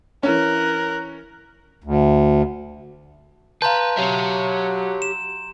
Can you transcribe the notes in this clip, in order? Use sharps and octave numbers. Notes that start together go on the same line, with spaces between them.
E3 C#4 A#4 F#6
D2
B4 F5 A5 A#5 C6 G6
F#3 G4 E5
E7